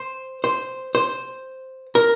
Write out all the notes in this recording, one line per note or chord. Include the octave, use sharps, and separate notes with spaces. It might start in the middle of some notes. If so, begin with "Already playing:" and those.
Already playing: C5
C5
C5
A#4